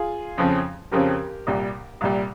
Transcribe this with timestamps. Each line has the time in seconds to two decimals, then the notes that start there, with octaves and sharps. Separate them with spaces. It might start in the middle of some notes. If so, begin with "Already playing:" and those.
Already playing: F4 G#4
0.38 F2 C#3 F3 C4
0.92 F2 C#3 F3 C4 G4 A#4
1.47 C2 A#2 G3
2.01 C2 A#2 G3